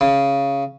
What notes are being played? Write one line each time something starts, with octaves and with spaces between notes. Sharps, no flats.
C#3